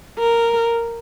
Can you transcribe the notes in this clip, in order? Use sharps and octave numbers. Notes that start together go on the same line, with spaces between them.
A#4